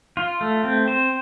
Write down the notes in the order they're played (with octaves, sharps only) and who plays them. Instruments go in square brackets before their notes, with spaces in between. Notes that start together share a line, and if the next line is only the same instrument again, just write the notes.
[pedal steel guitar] F4
A3
C4
C5